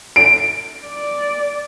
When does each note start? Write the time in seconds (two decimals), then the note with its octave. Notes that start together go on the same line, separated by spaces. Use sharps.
0.16 D7
0.86 D5